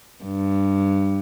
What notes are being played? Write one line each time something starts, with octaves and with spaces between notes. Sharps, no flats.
G2